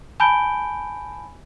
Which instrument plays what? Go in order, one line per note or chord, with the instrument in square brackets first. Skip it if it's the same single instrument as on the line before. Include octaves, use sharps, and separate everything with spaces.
[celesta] G#5 A5 B5 G6 D7 G7